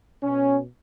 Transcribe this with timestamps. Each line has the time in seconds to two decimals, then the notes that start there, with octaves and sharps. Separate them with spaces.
0.23 B2 C#4